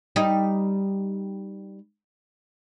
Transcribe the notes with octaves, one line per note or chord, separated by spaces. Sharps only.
G3 D#4